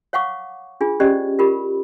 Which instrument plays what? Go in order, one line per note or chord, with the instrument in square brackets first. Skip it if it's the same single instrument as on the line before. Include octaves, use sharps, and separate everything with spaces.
[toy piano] C#5 F5 F#5 C#6 D6
D4 F4 G#4
C#4 G4 C5 D5 D#5
F4 G4 A#4 B5